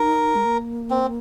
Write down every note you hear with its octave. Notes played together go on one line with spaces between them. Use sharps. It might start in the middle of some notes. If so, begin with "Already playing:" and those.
Already playing: D#4 A#4
G#3
A#3
C4